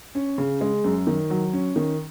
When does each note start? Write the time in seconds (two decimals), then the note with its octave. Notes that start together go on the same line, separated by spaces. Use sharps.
0.15 C#4
0.38 C#3
0.61 G#3
0.84 F#2
1.07 D#3
1.30 F#3
1.53 C#4
1.76 D#3